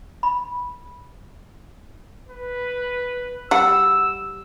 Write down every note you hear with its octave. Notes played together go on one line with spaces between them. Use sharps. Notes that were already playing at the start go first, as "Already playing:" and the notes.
B5
B4
G3 F#5 E6